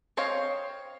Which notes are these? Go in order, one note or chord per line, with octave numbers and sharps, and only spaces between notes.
C4 C5 C#5 D#5 F5